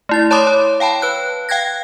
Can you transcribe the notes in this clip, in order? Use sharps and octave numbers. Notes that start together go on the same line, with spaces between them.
A3 E4 A6
C#5 A5 B5 C6 D6 D#6
C#5 A5
F5 G5 A5 B5
B4 F#6
F5 G5 F#6 G#6 A#6